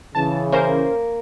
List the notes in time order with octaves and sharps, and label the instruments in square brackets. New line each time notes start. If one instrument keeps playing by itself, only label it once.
[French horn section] C#3 E3 [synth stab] A5
[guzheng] A#3 [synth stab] C#4 A#4 C5